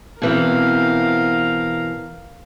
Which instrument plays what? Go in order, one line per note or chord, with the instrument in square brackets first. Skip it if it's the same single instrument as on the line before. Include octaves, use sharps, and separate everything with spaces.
[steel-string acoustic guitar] B2 E3 C4 [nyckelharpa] A#4 F5